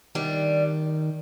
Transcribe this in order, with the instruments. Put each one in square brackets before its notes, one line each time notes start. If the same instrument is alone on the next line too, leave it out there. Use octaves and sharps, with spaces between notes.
[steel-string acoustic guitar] C3 G3 D4 [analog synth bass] D#3